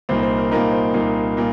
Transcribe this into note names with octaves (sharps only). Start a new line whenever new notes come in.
C2 A#2 A#3 D#4 C5
C5
A#4
C2 A#2 A#3 D#4 A#4
C5
C2 A#2 A#3 D#4
A#2 A#3